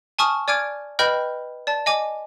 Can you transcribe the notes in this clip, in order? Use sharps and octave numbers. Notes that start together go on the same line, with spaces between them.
G#5 A5 C#6 D#6 F6
D5 G#5 D6 F6 G#6 D7
B4 D#5 G5 B5 F6 G6
D5 A5
D#5 G#5 D6